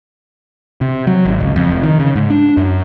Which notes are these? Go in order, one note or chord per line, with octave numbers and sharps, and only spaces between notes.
C3
F#3
G#1
C#2
F2
F1
D#3
C#3
G#2
D4
F#2